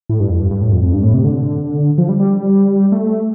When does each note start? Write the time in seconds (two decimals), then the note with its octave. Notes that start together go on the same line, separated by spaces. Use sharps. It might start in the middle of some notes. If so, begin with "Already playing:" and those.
0.09 A2
0.20 G2
0.30 F2
0.40 G2
0.51 G2
0.61 A2
0.73 F2
0.83 F2
0.93 G2
1.03 A2
1.14 C3
1.24 D3
1.98 F3
2.09 G3
2.20 G3
2.92 A3